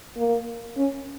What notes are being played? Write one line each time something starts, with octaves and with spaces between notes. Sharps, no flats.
A#3
C#4